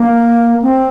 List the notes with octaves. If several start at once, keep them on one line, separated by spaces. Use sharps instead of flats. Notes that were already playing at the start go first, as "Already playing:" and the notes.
Already playing: A#3
C4